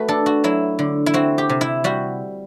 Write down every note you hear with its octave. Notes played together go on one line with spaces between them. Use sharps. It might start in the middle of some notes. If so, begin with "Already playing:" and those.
Already playing: A3 F#4 B4
D4 A4
F#4
F#3 E4
D3
E4
C4 F#4
G4
C3
E4
G3 F#4